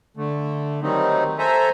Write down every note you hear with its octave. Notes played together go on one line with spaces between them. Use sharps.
D3 A3
D#3 F#3 G3 A3 C4 D#4
A4 C5 E5 G#5 A#5